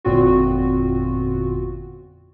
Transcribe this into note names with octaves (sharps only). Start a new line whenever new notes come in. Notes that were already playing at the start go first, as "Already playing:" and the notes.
G1 F2 A#2 C4 F4 F#4